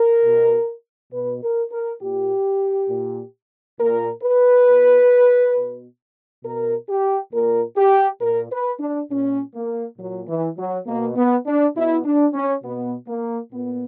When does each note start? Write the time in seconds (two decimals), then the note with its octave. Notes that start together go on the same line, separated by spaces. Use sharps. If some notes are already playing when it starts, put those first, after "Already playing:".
Already playing: A#4
0.23 B2
1.12 B2 B4
1.42 A#4
1.70 A#4
2.00 A#2 G4
2.89 A#2
3.78 A#2 A#4
4.22 B4
4.66 B2
5.54 B2
6.43 B2 A#4
6.87 G4
7.31 A#2 A#4
7.76 G4
8.21 A#2 A#4
8.50 B4
8.79 D4
9.09 A#2 C#4
9.54 A#3
9.97 A#2 F#3
10.28 E3
10.57 F#3
10.86 B2 A#3
11.15 B3
11.46 D4
11.74 B2 E4
12.05 D4
12.34 C#4
12.63 B2 B3
13.07 A#3
13.51 A#2 B3